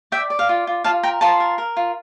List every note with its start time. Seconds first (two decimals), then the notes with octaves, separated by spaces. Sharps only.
0.12 D5 E5 G5
0.30 D5
0.39 F5
0.49 F4
0.67 F4
0.84 F4 F5 A5
1.03 A#4 G5 A#5
1.21 F4 A5 C6
1.40 A#4
1.58 A#4
1.77 F4